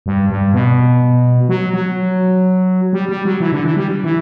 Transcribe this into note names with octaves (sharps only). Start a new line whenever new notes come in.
G2
G2
B2
F#3
F#3
G3
G3
F#3
E3
D3
E3
G3
E3